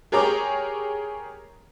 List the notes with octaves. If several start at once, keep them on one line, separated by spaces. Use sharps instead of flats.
G4 G#4 A#4 C#5 A#5 D6